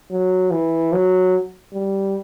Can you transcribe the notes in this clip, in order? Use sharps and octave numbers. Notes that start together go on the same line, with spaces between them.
F#3
E3
F#3
G3